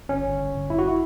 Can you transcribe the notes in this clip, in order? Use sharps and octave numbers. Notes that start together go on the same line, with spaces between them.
G1 C#4
G1
G1
G1
F#2 E4
F#4
E4